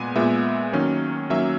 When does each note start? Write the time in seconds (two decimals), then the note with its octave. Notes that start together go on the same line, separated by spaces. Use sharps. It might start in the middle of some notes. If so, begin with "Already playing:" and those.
Already playing: A#2 G#3 B3 G#5
0.16 A#2 G#3 B3 E5
0.73 D#3 F#3 A#3 C#4
1.30 D#3 F#3 A#3 C#4 E5